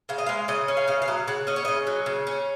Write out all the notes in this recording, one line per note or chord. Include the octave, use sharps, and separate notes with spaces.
C#3 F5
D#5
G#3 F5
C#3 D#5
C#4
F5
C#3 D#5
F5
F#3 D#5
C#3 F#5
C#4 D#5
C#5
C#3 D#5
F#3
C#3
C#4